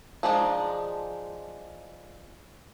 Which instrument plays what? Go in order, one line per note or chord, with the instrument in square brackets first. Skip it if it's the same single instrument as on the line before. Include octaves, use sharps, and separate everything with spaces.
[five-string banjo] F3 G#3 D4 D#4